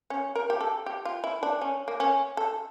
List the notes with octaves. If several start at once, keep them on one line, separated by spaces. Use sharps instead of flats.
C#4
A#4
G4
A4
G4
F4
E4
D4
C#4
A#3
C#4
A4